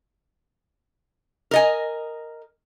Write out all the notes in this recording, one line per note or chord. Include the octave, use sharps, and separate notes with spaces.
A#4 D#5 G#5